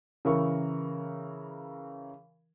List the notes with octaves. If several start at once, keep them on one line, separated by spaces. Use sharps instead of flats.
C#3 E3 A#4 C#6